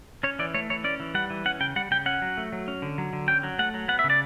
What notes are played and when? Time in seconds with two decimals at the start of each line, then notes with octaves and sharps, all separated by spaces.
0.23 C#4 C#5
0.39 E3 D5
0.54 A3 C#5
0.70 E3 C#5
0.84 C#4 D5
1.00 E3
1.14 G3 F#5
1.30 E3
1.45 C#4 F#5
1.60 C#3 G5
1.76 G3 F#5
1.91 C#3 G5
2.06 C#4 F#5
2.22 F#3
2.37 A3
2.52 F#3
2.68 C#4
2.82 D3
2.98 F#3
3.13 D3
3.28 C#4 G5
3.43 F#3
3.59 A3 F#5
3.74 F#3
3.88 B3 F#5
3.99 E5
4.04 C#3
4.10 D5